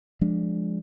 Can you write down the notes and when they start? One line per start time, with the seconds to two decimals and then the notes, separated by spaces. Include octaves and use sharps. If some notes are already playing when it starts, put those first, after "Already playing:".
0.21 F3 G#3 D4